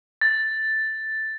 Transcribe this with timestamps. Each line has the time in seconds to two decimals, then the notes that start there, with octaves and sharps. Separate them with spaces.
0.21 A6